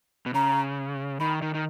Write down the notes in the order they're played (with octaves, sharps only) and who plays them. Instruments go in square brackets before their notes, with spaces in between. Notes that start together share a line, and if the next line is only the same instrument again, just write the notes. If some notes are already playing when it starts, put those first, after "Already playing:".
[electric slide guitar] B2
[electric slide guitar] C#3 [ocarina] A#5
[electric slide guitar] D#3 [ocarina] B5
[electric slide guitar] D#3
D#3